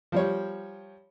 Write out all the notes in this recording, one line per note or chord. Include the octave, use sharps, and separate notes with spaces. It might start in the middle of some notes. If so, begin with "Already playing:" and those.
F3 G3 C#5